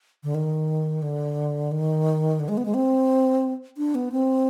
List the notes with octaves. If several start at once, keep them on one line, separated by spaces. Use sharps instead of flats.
D3
D#3
D3
D#3
D3
G#3
B3
G#3
C4
D4
B3
C4